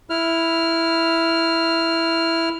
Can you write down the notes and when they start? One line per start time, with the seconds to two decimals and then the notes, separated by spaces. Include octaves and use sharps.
0.10 E4 F6